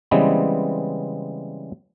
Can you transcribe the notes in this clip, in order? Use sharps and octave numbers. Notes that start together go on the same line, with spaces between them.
C#3 E3 G3 G#3 B3 C4